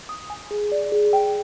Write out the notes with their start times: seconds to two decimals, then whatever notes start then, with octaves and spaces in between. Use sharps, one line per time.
0.09 D#6
0.30 G#5
0.51 G#4
0.72 D5
0.92 G#4
1.13 G5